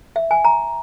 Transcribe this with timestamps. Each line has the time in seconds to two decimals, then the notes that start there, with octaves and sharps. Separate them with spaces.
0.16 E5
0.31 G#5
0.45 A#5